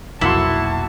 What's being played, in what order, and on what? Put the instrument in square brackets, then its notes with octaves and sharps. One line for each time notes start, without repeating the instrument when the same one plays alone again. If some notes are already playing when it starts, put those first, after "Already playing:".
[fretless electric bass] F1 B1 F2 [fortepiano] A#3 F#4 C6 [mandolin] E4 [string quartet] A5